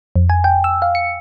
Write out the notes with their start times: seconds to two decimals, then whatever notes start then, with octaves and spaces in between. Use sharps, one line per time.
0.16 F2
0.30 G#5
0.44 G5
0.64 E6
0.82 F5
0.95 C#7